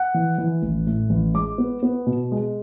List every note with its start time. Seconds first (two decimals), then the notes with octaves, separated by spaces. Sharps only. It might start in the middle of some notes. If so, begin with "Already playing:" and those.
Already playing: F#5
0.14 E3
0.38 E3
0.63 A1
0.87 A2
1.10 A1
1.34 G#3 D6
1.58 B3
1.83 B3
2.07 B2
2.32 G#3